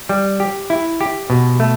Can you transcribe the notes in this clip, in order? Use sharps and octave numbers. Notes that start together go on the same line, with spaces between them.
G3
G4
E4
G4
B2
A3